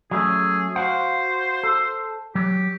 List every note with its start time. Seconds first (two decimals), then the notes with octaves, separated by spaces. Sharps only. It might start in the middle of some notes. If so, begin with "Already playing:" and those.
0.11 F#3 A3 C#4 G#4
0.76 F#4 C5 F5 F#5
1.63 A4
2.35 F#3 G4